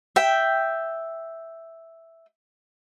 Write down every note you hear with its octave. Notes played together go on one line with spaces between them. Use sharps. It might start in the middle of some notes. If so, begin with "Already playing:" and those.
E5 G5